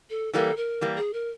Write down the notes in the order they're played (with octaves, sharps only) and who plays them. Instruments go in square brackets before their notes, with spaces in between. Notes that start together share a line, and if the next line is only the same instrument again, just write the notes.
[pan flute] A4
[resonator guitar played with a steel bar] E3 G3 A#3 [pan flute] A4
[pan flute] A#4
[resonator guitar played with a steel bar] E3 G3 A#3
[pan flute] G#4
A#4